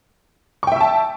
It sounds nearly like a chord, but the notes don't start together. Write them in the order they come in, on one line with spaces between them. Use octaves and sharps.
C#6 G5 E5 E6 A5